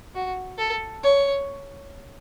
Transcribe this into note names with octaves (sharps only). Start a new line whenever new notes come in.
F#4
A4
C#5